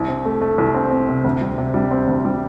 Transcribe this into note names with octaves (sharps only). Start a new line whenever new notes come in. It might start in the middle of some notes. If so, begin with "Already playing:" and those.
Already playing: C2
C4
A3
A3
C2
C4
C4
C3
D2
G3
C3
G3
C4
D2
G3